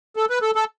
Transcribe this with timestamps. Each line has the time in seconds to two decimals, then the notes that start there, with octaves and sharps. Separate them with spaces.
0.16 A4
0.30 B4
0.42 A4
0.55 A4